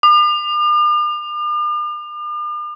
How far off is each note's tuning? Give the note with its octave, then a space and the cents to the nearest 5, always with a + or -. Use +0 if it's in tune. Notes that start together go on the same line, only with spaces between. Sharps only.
D6 +45